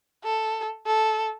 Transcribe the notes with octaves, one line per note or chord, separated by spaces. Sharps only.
A4
A4